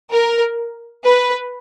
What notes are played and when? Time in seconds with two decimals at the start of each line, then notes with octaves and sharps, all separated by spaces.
0.12 A#4
1.05 B4